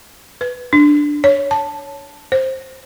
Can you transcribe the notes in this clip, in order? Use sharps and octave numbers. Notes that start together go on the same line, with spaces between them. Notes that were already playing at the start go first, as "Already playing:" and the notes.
B4
D4
C#5
A5
C5